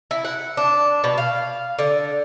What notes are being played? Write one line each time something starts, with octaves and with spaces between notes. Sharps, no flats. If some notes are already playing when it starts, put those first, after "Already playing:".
E4
F#5
D4
B2
F5
D3